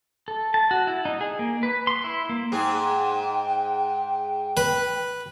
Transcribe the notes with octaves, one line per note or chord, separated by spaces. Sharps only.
A4
A5
F#4
E4
D#4
G#4
A#3
B4
C6
E4
A#3
G#2 G#4 G5
B4